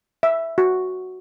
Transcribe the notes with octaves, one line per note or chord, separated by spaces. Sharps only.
E5
F#4